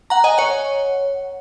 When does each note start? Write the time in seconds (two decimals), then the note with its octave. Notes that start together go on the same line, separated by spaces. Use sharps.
0.10 F#5 A#5
0.24 D#5 G#5
0.38 C#5 F#5